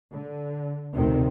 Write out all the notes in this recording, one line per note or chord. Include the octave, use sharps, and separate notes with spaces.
D3
F1 D2 C3 D#3 C4